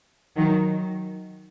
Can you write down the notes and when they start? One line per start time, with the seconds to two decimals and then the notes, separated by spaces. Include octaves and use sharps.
0.36 D#3 F#3